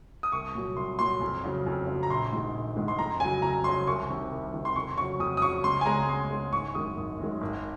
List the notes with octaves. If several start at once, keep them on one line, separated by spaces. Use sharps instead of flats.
D#6
C2 C#6
A#2 F#3
C2 C6
A#2 F#3 C6
F2
C#3 F#3
F2
C#3 F#3
A#5
A#1 C6
G#2 D#3 G#3
A#1
G#2 D#3 G#3
C6
F2 A#5
C#3 F#3 G#5
F2 A#5
C#3 F#3 C6
C2 C#6
C3 D#3
C2
C3 D#3
C6
F2 C#6
C#3 F#3 C#6
F2 D#6
D#6
C#3 F#3 C#6
C#2 C6
G#5
C#3 G#3 A#5
C#2 C6
C#3 G#3
G#1 C#6
F#2 D#3 G#3 D#6
G#1
F#2 D#3 G#3
G#1